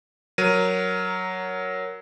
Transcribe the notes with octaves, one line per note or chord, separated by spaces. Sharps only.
F#3 A#4 D#7